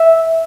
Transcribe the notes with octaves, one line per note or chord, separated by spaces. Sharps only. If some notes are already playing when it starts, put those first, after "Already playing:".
Already playing: E5